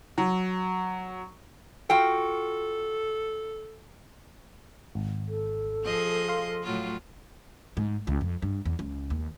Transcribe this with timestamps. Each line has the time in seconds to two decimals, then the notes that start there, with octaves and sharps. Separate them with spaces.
0.18 F#3
1.90 F4 F#4 A4 G5
4.95 G#1
5.29 A4
5.84 F3 G#4 D#5
6.29 F5 C6
6.63 A2 F#3 F4
7.77 G#2
8.07 C#2
8.21 F2
8.42 G2
8.65 E2
8.79 C#2
9.10 D#2